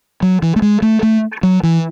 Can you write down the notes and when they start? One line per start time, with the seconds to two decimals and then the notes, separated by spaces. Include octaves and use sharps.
0.22 F#3
0.42 E3
0.56 A3
0.62 G#3
0.82 A3
1.03 A3
1.43 F#3
1.63 E3